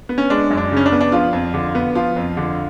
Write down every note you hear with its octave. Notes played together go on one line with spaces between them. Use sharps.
B3
C#4
G#3 D4
F#2
D4
C#3 C#4
D4
B3
D4
F3 F4
F2
D3
B3
F3 F4
F2
D3